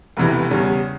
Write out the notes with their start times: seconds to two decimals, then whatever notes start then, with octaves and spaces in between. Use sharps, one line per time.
0.17 F1 E2 C3 E3
0.51 E2 C#3 G3 C#4